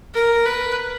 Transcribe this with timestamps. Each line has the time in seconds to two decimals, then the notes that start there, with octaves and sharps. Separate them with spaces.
0.14 A#4
0.45 B4